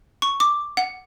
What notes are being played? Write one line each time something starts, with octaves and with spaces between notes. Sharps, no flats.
C#6
D6
F#5